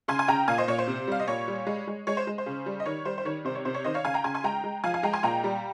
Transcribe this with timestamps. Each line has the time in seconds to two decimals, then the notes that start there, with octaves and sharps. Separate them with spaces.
0.08 C#3 G#5 C6
0.19 G#5
0.28 C#3 G5 A#5
0.48 A#2 F5 G#5
0.58 C5 D#5
0.68 A#2 C#5
0.78 C5
0.88 C3
1.08 G3 F5
1.20 D#5
1.27 A#2 C#5
1.48 G3
1.67 G#3
1.87 G#3
2.07 G#3 C#5
2.17 C5
2.27 G#3
2.38 C5
2.46 C#3
2.66 G3
2.80 D#5
2.86 D#3 C#5
3.05 G3 C5
3.18 C5
3.25 D#3 C#5
3.45 C3 C5
3.55 C#5
3.65 C3 C5
3.74 C#5
3.84 D#3 C5 D#5
3.94 C#5 F5
4.05 C#3 F5 G#5
4.14 G5 A#5
4.24 C#3 G#5 C6
4.34 G#5 C6
4.44 G#3 G5 A#5
4.64 G#3
4.84 F3 F5 G#5
4.94 F5 G#5
5.03 G#3 G5 A#5
5.13 G#5 C6
5.23 A#2 G5 A#5
5.44 G3